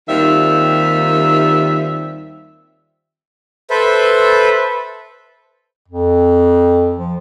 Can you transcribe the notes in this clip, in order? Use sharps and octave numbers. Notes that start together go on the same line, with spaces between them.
D#2 D#3 G3 C4 F4 E5
A4 B4 C5 E5
F2
F3